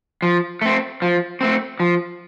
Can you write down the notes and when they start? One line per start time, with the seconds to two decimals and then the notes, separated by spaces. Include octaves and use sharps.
0.22 F3
0.62 A3 C4
1.02 F3
1.41 A3 C4
1.80 F3